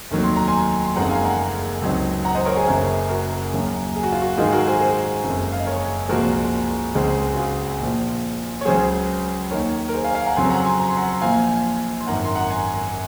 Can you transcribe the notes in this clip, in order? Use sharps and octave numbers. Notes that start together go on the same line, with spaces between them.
F1 D#2 D#3 F#3
C6
A#5
G#5 C6
C6
F#1 F2 C#3 G#3 D#4 F#5 A#5
F5 G#5
F#5 A#5
F5 G#5
C#2 C3 F#3 C4 D#4
F#5 A#5
C5 D#5
A#4 C#5
G#4 C5
F#1 F#2 C#3
F#4 A#4
D#2 C#3 F#3 C#4
G#4
F#4
F4
F#4
G#2 D#3 G#3 D#4 F4 G#4
F#4 A#4
G#4 C5
G#4 C5
F#1 F2 C#3 G#3
F5
D#5
A#4 C#5
C2 A#2 F3 G#3 F#4 A#4
C#2 C#3 G#3 C4
F#4
F4 G#4
A#1 A#2 F3
C#5
C#2 C#3 F#3 G#4 C5
D#2 D#3 A#3 D#4 A#4 C#5
A#4
G#4 C5
F5 G#5
F5 G#5
F#5 A#5
F2 C#3 F#3 C4 G#5 C6
F#5 A#5
G#5 C6
A#5
C6
F#5 A#5
A#1 A#2 F3 F5 G#5
C6
G#1 F#2 D#3 F#5 A#5
C6
F#5 A#5
G#5 C6